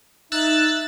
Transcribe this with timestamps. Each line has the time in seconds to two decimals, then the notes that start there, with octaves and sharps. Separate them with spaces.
0.32 D#4 E5 E6 F#6 A6